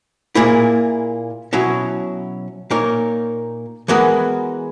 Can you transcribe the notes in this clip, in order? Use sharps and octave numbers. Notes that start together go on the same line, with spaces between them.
A#2 A#3 E4 G#4
B2 F#3 C#4 E4
A#2 A#3 D#4 A#4 C#5
E3 G#3 B3 F#4 A#4